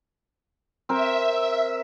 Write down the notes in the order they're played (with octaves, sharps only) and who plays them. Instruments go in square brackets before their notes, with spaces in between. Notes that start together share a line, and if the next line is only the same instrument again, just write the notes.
[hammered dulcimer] C4 A#4 [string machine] E5